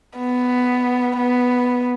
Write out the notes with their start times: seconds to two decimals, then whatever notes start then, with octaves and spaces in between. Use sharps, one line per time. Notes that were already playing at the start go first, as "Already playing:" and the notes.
0.17 B3
1.17 B3